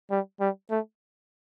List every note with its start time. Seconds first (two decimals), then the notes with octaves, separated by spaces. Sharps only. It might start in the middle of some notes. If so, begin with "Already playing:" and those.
0.11 G3
0.40 G3
0.70 A3